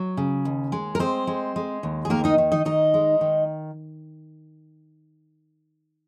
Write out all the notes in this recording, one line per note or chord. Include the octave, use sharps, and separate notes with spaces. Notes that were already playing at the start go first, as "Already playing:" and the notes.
Already playing: F#3
C#3
D#2
G#3
A#4
G#3 C4 C5
G#3
G#3
D#2
G#4
D#3 A#3 A#4
D#4 D#5
D#3
D#4 D#5
D#3 D#4 D#5
G#3
D#3